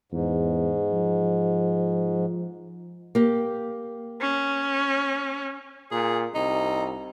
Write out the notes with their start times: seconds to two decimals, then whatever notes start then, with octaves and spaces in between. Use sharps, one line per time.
0.12 E2 G#2
0.92 F3
3.15 A#3 G4
4.21 C#4
5.92 A#2 G#4
6.35 C2 D#4